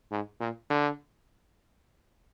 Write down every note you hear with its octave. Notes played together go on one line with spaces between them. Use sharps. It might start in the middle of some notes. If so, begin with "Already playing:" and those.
G#2
A#2
D3